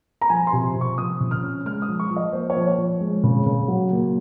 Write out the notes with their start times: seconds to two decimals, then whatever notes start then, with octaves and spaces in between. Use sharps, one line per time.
0.21 A#5
0.30 F3 G#5
0.47 C6
0.53 C3
0.75 C3
0.81 C#6
0.98 F3 D#6
1.20 C#3
1.31 F6
1.43 C#4
1.65 G#3 F6
1.82 D#6
1.88 F3
2.00 C#6
2.11 F3
2.16 D#5
2.33 A#3 C5
2.50 C#5
2.56 F3
2.68 C#5
2.78 F3
3.01 G#3
3.24 C#3
3.46 C#3
3.68 F#3
3.91 A#2